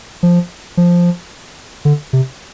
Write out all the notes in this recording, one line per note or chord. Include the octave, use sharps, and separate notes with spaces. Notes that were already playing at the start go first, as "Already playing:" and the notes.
F3
F3
D3
C3